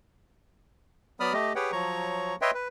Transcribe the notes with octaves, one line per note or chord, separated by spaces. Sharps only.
F#3 B3 D5 B5 D#6 F6
A3 G4 D#5
G4 G#4 B4 C#5 F#5 G5
F3 F#3 C#5 A#5 C#6
B4 C#5 D#5 E5 G5 C6
B4